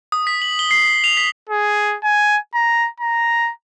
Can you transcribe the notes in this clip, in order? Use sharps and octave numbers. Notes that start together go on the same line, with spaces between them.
D#6
B6
F#7
G7
C7
F7
B6
G#4
G#5
A#5
A#5